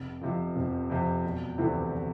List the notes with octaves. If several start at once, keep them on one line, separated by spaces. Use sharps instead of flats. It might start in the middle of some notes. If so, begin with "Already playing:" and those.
Already playing: F1
F2 C3 F3
F1
F2 C3 F3
E1
D2 C3 E3